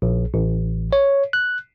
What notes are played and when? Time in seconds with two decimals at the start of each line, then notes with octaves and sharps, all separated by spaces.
0.02 A#1
0.34 A1
0.93 C#5
1.33 F#6